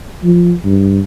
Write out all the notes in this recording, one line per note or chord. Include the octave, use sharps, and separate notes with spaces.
F3
G2